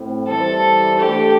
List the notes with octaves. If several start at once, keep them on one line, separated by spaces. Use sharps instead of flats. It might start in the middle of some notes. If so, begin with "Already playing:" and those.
Already playing: A2 C4
E3 G3 E4 A4 C5
A3 D4 G4 A4